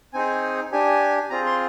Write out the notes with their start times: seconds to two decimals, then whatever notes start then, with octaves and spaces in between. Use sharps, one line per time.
0.13 C4 D#4 G#4 G#5
0.72 D4 G4 G#5
1.30 C4 F4 G#4 A#5
1.46 C6